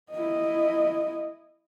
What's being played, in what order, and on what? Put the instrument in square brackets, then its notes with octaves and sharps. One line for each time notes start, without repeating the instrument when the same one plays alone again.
[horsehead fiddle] E4 D#5